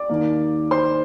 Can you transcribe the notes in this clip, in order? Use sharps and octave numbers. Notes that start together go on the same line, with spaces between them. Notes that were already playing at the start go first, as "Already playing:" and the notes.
Already playing: D5 D6
D#2 D#3 A#3
C5 C6